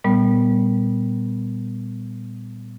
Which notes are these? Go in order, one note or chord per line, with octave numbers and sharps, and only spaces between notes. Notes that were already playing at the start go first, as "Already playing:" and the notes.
A#2 G3 B3